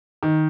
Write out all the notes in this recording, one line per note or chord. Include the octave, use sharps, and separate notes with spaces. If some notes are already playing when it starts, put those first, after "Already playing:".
D#3